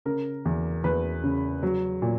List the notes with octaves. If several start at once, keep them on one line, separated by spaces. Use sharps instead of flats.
C#3 A#4
E2
E2 B4
C#3
F#3
A#2